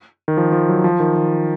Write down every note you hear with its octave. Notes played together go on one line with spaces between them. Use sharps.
D#3
F3
F3
F#3
F3
D#3
D#3